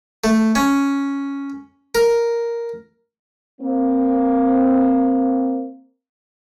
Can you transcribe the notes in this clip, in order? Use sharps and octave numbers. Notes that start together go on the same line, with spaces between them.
A3
C#4
A#4
A#3 C4